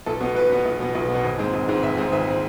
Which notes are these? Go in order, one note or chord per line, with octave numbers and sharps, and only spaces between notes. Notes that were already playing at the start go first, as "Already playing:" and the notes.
B1 A4
B2 B3
B1 B4
B2 B3
B1
B2 B3
B1
B3
B2
G#1
G#2 G#3 C4
G#1
G#2 G#3 C4
G#1 E5
G#2 G#3 C4
G#1 E5
G#3 C4